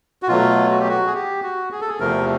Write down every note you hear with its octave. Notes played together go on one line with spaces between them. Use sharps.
F#4
B2 F#3 A3 F4
F#4
G4
F#4
G#4
G4
F#4
G#4
A4
G#4
E2 C3 F3 A3 A#4